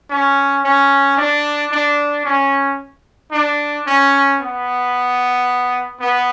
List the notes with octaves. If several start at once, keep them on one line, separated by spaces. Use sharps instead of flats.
C#4
C#4
D4
D4
C#4
D4
C#4
B3
B3